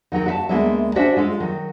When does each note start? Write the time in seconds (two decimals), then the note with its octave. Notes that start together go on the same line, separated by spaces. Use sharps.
0.12 D#3 F#3 D#4 A#4
0.26 F#4 E5 A5
0.49 D2 G#3 A#3 B3 E5
0.96 C#4 D4 F#4 C5 E5
1.16 G#3 F4 A4
1.40 D#3 F#3